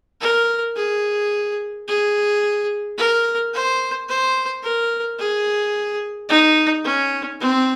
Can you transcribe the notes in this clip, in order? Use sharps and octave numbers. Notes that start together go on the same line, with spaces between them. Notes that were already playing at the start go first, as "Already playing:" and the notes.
A#4
G#4
G#4
A#4
C5
C5
A#4
G#4
D#4
C#4
C4